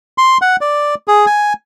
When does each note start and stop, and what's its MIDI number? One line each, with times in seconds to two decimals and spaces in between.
0.18 0.38 84
0.42 0.56 78
0.61 0.95 74
1.08 1.26 68
1.26 1.53 80